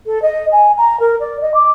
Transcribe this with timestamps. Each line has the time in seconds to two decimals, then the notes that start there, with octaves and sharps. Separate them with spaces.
0.06 A4
0.22 D#5
0.52 G#5
0.77 A#5
1.00 A#4
1.20 D5
1.41 D#5
1.54 D6